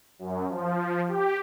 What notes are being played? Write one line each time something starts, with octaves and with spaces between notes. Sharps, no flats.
F#2
F3
G4